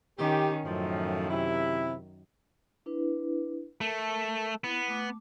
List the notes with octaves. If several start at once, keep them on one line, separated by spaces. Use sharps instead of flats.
D#3 C#4 G4
F#2 A2 D#3 F3
C3 E4
D4 E4 B4
A3 A#4
B3 E4
A3 D6